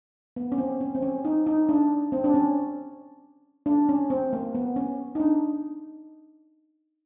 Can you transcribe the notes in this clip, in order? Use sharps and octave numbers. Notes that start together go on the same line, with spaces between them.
B3
C#4
C4
C#4
C4
C#4
D#4
D#4
D4
C4
D4
C#4
D4
C#4
C4
A#3
B3
C#4
D#4
D4